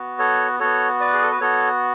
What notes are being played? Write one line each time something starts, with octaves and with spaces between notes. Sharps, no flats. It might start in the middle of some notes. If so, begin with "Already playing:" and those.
Already playing: B3 F#4
A4 C#5
B3 F#4 A4 C#5
B4 D5
G#4
A4
B4
B3 F#4 A4 C#5